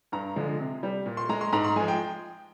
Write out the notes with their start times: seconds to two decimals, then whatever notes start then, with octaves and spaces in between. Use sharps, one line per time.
0.12 G2 A#5
0.36 D3 F3 G#3
0.60 C3
0.83 G3
1.06 A#2
1.17 C6
1.29 G#3 A#5
1.41 C6
1.53 G#2 A#5
1.64 C6
1.76 F3 G#3 G#5
1.88 G5